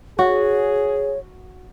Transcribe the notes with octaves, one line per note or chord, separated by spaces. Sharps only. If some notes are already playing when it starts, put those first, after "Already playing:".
F#4 G#4 C#5